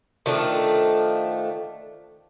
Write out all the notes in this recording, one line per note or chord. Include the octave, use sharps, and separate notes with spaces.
D#3 F3 A3 D4